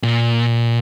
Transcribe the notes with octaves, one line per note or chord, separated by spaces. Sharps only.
A#2